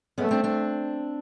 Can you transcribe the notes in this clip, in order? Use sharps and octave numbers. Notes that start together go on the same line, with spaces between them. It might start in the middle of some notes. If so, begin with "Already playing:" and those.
A3 B3 C#4
C4 D4
C4 D4